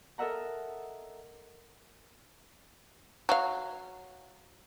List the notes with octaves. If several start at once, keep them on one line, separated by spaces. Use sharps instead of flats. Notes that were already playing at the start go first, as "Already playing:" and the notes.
A4 A#4 D#5 E5 F#5 A#5
F#3 F5